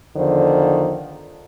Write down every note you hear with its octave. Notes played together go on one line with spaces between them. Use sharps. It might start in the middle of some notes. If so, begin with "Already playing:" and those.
E2 D3 D#3 F3 C5